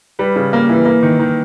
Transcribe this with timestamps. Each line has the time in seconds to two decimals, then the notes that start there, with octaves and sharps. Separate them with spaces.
0.19 G3 B4
0.36 C#3
0.53 A#3
0.69 E3
0.85 A#3
1.03 D#3
1.19 D#3